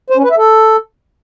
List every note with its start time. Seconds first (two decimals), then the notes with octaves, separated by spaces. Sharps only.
0.10 C5
0.17 C#4
0.24 B4
0.31 E5
0.37 A4